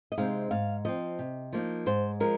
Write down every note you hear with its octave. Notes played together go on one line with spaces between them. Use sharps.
D#5
C3 G#3 C4 D#4 F5
G#2 F5
F3 C4 D#5
C3
F3 A#3 D#4
G#2 C5
F3 G#3 A#4